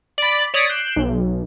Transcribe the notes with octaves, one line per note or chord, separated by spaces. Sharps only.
D5 B5
C#5 D5 D#6 A#6 B6
F#6 G6 C7 D7 E7
B1